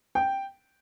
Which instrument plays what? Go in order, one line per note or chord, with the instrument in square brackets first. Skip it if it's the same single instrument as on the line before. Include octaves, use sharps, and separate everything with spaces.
[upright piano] G5